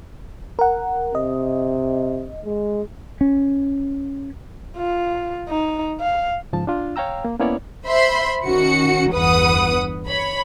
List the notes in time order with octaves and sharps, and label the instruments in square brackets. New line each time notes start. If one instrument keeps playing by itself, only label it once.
[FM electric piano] A#4 F#5
[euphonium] C3 [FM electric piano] D#5
[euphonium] G#3
[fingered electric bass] C#4
[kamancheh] F4
D#4
F5
[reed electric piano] C#2 G#2 F3 A5
D4 F4
C#5 F5 G5 A#5 E6
A#3
A#3 B3 C#4 E4 C#5 D5
[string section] C5 E5 B5 C6
D#3 C#4 F#4 C#7
G1 E2 B4 F#5 D#6
C#5 B5